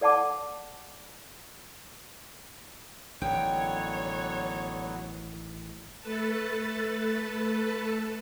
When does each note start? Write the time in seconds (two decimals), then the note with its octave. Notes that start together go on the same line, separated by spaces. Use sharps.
0.01 A4 D5 F#5 A5 D6
3.22 A1 D3 D#3 F#3 B3 C#5 G5
6.00 A3 A4 B4 A5